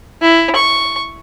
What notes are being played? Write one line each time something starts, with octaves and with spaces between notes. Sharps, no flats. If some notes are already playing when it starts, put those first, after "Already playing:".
E4
C#6